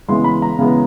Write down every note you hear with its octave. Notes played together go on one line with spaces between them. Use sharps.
C#3 E3 G#3 B3 C6
B5
A#5
C#3 E3 G#3 B3